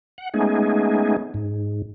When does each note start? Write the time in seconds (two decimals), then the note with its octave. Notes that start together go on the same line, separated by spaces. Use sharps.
0.18 F#5
0.34 G#3 A3 B3 C#4 D#4 G#4
1.34 G#2